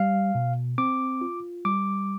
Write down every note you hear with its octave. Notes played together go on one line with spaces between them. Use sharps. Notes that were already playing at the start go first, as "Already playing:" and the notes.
Already playing: G3 F5
B2
C4 D6
F4
G3 D6